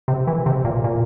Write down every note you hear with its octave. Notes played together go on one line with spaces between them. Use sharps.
C3
E3
C3
A#2
A#2